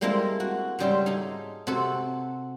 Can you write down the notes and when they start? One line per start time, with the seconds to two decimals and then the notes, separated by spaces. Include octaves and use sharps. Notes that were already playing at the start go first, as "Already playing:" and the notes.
0.01 G3 G#3 A#3 C4 E4 A4
0.40 F#4
0.79 G#2 C#3 G3 D5 E5 C6
1.06 D#4 G#4 A4
1.67 C3 F#4 A4